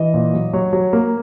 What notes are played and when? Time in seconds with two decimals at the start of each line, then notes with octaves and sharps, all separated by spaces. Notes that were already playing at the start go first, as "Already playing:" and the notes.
Already playing: E3 D#5
0.14 A#2
0.34 F#3
0.53 F#3 C#5
0.73 F#3
0.93 A#3